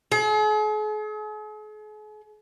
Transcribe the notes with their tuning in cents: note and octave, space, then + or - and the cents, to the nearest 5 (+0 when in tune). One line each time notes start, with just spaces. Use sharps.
G#4 +45